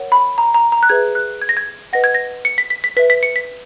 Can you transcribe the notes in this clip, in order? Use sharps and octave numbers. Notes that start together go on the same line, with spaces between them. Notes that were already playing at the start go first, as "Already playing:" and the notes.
Already playing: A#4 C#5 F#5
B5
A#5
A#5
A#5
F#6
G#4 B4 E5 G#6
F#6
G#6
A#6
G#6
B4 D#5 F#5 A#6
G#6
A#6
C#7
B6
B6
B6
B4 E5 B6
B6
C#7
B6